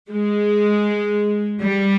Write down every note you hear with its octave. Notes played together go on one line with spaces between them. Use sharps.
G#3
G3